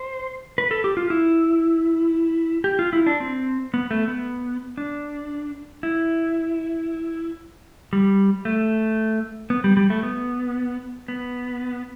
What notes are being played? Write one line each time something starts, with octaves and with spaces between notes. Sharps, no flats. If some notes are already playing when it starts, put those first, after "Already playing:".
Already playing: C5
B4
A4
G4
F4
E4
G4
F4
E4
D4
C4
B3
A3
B3
D4
E4
G3
A3
B3
G3
G3
A3
B3
B3